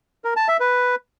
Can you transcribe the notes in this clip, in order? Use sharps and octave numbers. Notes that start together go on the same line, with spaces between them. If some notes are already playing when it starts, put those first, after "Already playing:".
A#4
A5
E5
B4